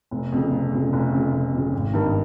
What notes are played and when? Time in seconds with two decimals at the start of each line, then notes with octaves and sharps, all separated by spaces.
0.11 F1
0.32 F2 C#3
0.51 F1
0.72 F2 C#3
0.93 F1
1.12 F2 C#3
1.32 F1
1.52 F2
1.58 C#3
1.73 G#1
1.94 G2 D#3 A#3